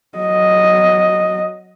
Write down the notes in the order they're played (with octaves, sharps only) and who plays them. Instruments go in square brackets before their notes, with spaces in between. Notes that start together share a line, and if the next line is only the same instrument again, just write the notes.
[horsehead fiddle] F#3 D#5